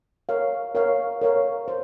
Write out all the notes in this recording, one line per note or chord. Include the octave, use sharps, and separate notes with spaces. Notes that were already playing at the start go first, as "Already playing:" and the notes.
A#4 C#5 F5
A#4 C#5 F5
A#4 C#5 F5
C5